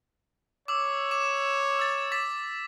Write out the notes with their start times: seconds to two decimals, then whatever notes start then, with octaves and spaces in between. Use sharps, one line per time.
0.68 C#5 D6 E6
1.11 D6 E7
1.79 E6 A6
2.12 D6 A6 B6